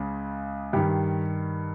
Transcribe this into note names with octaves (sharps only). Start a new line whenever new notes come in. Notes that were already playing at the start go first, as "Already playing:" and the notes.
Already playing: C#2 C#3
G2 D#3 G4